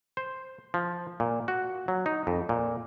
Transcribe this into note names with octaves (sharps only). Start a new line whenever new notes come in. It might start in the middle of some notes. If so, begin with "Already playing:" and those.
C5
F3
A#2
F#4
F#3
D#4
F2
A#2